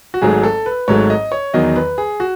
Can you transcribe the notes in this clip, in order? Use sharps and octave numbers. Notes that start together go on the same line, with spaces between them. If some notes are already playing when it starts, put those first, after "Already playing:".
F#4
G#1 G#2 F#3 A3 G#4
A4
B4
G#1 G#2 F#3 A3 C#5
D#5
C#5
E2 D#3 F#3 D#5
B4
G#4
F#4